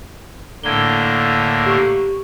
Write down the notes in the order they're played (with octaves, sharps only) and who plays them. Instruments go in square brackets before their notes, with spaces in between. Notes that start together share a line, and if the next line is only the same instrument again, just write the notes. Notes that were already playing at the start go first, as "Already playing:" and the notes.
[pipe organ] A2 D3 A#3 [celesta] G#6 G7
[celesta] G4 C#6